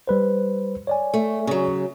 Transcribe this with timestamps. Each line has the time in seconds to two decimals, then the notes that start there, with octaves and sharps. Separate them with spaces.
0.07 G3 B4 C5
0.87 C#5 D5 G#5
1.14 A3
1.47 C#3 F#3